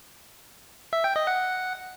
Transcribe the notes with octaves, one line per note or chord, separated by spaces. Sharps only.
E5
G5
D#5
F#5